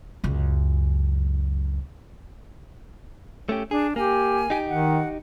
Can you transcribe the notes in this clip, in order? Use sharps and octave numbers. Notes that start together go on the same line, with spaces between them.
C#2 F#2
A3 C#4 G4
D4 G#4
A#3 G4 G#5
D#4 G4
D#3 F#5